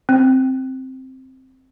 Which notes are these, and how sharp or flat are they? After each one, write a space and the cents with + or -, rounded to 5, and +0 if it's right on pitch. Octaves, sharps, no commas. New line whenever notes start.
C4 +0